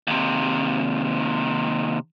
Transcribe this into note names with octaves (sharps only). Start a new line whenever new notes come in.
D#2 C3